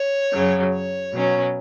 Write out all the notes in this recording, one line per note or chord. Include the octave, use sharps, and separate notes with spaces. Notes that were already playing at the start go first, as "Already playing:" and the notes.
Already playing: C#5
F#2 C#3 F#3
C#5
B2 F#3 C#4